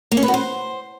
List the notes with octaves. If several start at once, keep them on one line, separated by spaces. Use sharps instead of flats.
A#3
C#4
B4
F#4
C5